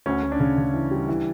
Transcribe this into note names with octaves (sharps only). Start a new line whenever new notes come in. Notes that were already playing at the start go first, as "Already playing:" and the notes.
D2 C#4
D2
D4
C#3
C#3
E3
G3
E3